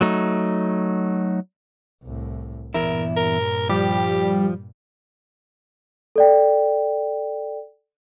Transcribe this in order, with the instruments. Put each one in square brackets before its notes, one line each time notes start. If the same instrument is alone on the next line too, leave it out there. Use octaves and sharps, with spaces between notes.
[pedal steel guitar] F#3 A3 D#4
[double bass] C2 A2
[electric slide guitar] E2 E4 [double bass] G2 A#2 [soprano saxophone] A#4
[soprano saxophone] A#4
[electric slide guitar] F3 [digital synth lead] G3 [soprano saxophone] G4
[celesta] A4 D5 G5